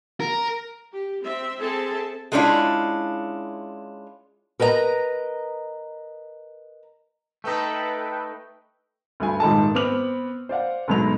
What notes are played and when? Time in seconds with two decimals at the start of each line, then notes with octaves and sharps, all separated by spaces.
0.20 A#4
0.93 G4
1.23 C4 E5
1.60 C4 G#4 A4 E5 A5
2.32 G#3 A3 C#4 D4 E4 F4
4.60 A#4 B4 D#5 F#5 A#5
7.44 A3 D#4 A4 B4 G5
9.20 D2 G2 G#5
9.40 D#1 G#2 D#3 D#4 A4 A5
9.75 B3 C4 D6 F6 F#7
10.49 C5 D5 F5 F#5
10.88 D2 G#2 B2 F#3 F7